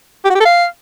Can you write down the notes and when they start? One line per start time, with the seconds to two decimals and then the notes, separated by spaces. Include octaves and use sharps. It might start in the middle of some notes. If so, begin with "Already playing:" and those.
0.25 G4
0.30 F#4
0.35 G4
0.40 A4
0.45 F5